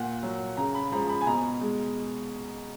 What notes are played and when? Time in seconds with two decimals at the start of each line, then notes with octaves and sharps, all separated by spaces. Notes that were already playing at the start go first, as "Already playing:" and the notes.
Already playing: A#2 F#5
0.23 F#3
0.57 C#3 A#5
0.75 B5
0.92 F3 G#3 A#5
1.09 B5
1.21 G#5
1.27 B2 A#5
1.61 G#3